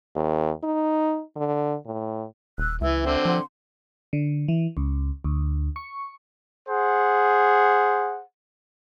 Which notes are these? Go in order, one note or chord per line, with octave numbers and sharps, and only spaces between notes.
D#2
D#4
D3
A2
D#1 E6 F#6
C#2 E3 E5 E6
D3 C4
F3 F#5 C6
D3
E3
C#2
D2
C#6
G#4 C5 F#5